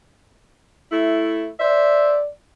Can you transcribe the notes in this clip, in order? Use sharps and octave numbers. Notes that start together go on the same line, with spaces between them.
A3 E4
C5 D5 E5